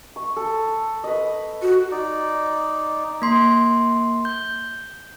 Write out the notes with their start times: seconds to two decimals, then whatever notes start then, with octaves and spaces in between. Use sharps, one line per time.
0.16 C#6
0.36 A4
1.04 B4 D#5
1.62 F#4
1.91 D#4 D5
3.22 A#3 C6
4.25 G6